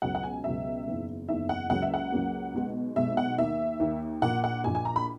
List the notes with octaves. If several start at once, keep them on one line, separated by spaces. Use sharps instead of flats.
C#2 B2 F#3 F#5
F#5
G#5
C#2 B2 F#3 E5
F#1 E2 D#3
F#1 E2 D#3 E5
F#5
C#2 C#3 F#3 A#3 F#5
E5
F#5
C#2 C#3 F#3 A#3
B1 B2 G#3
B1 B2 G#3 E5
F#5
D#2 D#3 A#3 E5
D#2 D#3 A#3
A#1 A#2 A#3 F#5
F#5
A#1 A#2 A#3 G#5
G#5
A#5
B5